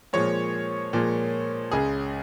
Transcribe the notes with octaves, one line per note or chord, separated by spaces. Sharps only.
A#2 F3 G#3 C#5
A#2 F3 G#3
C#2 C#3 G#3 G#4